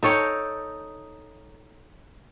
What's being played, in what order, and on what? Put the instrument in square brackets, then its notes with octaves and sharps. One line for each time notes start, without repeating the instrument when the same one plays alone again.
[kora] D#4 A4 C#5 G5